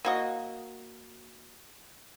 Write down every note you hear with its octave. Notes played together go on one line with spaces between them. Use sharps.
A#3 F#4 D#5